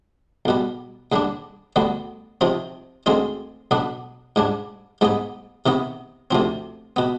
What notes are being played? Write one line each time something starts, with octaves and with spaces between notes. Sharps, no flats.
B1 B2 G3
D#2 D3 G3 D4
D2 D3 G3 B3
C3 F3 C4 D#4
D2 D3 G#3 C4 D#4
B1 B2 B3 D4
G#2 G3 D4
G#2 G3 B3 D#4
C3 D#3 B3 D#4
D2 C3 F3 C4
B2 B3